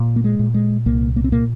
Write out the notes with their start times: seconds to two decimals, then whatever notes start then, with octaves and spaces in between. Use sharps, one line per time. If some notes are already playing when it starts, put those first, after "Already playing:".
Already playing: A#2
0.16 A#3
0.24 G#3
0.39 A#2
0.54 G#3
0.86 C2 A#3
1.16 A#3
1.24 C4
1.32 A#2 A#3